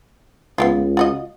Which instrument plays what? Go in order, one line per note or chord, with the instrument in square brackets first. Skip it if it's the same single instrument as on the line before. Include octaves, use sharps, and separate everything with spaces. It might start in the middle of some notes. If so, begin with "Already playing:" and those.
[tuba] C#2 [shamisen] B3 E4 F4
[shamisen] F4 F#4 D#5